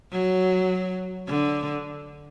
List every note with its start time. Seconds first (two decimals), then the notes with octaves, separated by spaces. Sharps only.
0.12 F#3
1.28 D3